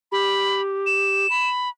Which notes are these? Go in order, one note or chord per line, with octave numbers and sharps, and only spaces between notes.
G4 B5
E7
B5